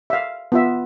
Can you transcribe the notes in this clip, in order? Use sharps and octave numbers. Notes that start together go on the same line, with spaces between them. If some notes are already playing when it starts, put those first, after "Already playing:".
E5 F5
B3 F4 E5